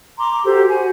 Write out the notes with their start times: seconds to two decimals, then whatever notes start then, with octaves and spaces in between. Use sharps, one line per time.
0.18 A#5 C6 D6
0.45 F#4 G4 A4 C5
0.68 F#4 C5 G#5